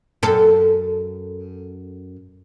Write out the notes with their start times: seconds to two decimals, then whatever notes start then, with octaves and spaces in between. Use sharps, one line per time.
0.23 F#2 A4